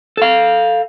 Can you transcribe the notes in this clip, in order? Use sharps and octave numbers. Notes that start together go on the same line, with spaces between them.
A4 F5